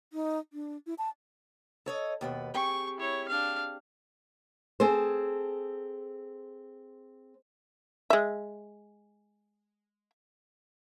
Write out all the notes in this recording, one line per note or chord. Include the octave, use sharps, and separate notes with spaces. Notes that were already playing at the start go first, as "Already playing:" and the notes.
D#4
D4
E4
A5
A4 C#5 D#5
D#2 B2 B4
C4 G4 G#4 C#6
E4 C#5
D4 F5
C4 G#4 A4 C5
G#3 E5